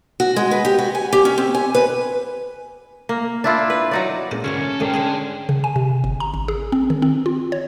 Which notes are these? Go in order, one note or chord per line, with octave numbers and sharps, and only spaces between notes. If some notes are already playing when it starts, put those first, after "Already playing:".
F#4
G#3
B4
G4
F#4
G#5
G4
C#4
C4
G#5
B4
A#3
D4 E4 F4
B4
F#3 D#4 D5
A#2 G#3 C#4 E4
D2 G#2 A#3 C#4 F#4 A#5
A4
D2 G#2 D3 D#3 C5 G5 A5 A#5
D3 D4 G#4 C5 F#5
C#3
G#5
C3
G1
A#5
G#1
G#4
C4
D#3
C4
F4
C#5